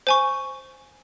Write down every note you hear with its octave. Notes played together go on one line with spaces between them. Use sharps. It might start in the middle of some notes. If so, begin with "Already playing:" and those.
C5 G#5 C#6